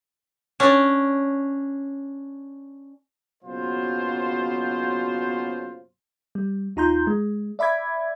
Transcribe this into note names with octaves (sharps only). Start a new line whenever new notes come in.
C#4 D4
F#1 B2 F#3 F4 C5
G3
D#2 D#4 F4 A#5 C6 G6
G#3
D5 E5 B5 D6 G#6